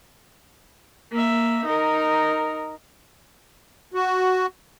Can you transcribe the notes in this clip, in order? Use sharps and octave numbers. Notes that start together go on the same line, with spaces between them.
A#3 E5
D#4 A#4
F#4